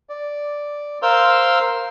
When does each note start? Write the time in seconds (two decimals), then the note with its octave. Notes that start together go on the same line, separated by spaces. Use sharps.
0.09 D5
1.02 A#4 C5 F5 C6 E6